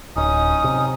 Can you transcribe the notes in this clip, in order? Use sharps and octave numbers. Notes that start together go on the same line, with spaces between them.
D1 C#4 D#4 D#6
C3